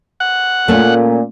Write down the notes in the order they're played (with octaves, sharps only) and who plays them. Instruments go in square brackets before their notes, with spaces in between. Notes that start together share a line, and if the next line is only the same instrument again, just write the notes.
[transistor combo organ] F#5
[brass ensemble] A#2 [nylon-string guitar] A3 C#4